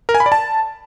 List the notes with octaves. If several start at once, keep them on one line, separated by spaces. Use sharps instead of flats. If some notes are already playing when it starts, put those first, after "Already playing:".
A#4
G#5
B5
D5
A5